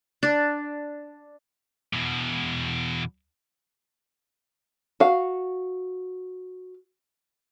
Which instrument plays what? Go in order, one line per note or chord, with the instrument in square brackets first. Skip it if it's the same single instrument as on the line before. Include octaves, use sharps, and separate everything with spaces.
[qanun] D4
[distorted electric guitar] E2 B2
[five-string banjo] F#4 F5